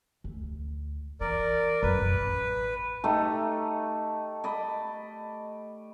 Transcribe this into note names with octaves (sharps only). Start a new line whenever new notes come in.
D2
E3 A#4 D5
F#2 B4
A1
A3 D#4 G4 D#5
D5 D#5 B5